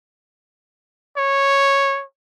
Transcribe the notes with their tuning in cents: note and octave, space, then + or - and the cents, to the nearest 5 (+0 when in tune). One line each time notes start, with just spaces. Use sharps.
C#5 -5